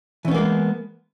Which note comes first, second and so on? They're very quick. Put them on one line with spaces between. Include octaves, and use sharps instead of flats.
E3 C#4 B3 A#3 G#3